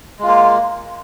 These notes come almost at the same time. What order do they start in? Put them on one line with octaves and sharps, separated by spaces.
G#3 F4 A#3